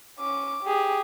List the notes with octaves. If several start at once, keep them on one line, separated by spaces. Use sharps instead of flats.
C#4 D6
G4 G#4